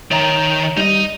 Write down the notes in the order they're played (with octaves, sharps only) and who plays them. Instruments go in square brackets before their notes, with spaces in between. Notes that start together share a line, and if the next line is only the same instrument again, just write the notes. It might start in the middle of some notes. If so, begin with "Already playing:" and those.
[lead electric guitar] D#3 [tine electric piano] C#5 E5 A#5
[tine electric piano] G3 [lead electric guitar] D#4 D#5